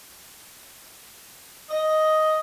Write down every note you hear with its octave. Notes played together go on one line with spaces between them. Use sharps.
D#5